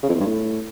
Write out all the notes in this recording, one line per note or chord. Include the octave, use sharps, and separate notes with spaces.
C#3
F2
E2
G2
A2